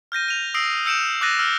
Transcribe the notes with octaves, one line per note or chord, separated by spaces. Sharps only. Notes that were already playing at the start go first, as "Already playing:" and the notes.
F6 G6 A#6 D#7
D#7 F7
D#6 E6 A#6 C7 D7
E6 G6 C#7 D7 E7 F7
D6 E6 F#6 A6 A#6 D#7
E6 F6